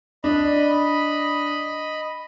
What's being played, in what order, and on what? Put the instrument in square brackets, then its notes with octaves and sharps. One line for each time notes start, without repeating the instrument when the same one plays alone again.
[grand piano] D4 [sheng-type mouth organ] D#5 B5